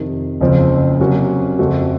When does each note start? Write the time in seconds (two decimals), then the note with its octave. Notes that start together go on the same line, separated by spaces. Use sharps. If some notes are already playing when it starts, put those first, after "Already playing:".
Already playing: F2 C3 D#3
0.41 F#1 F2 C#3 F3 C4
1.00 C3 F#3 A#3 C#4 F#4
1.59 F2 C#3 A3 C4 F#4